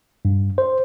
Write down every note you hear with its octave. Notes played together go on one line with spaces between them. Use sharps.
G2
C5